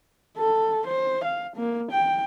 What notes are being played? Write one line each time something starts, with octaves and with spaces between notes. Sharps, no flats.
A4
C5
F5
A#3
G5